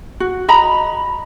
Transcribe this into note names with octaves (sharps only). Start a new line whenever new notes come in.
F#4
D#5 A#5 B5